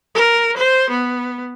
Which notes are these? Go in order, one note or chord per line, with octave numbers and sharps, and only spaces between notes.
A#4
C5
B3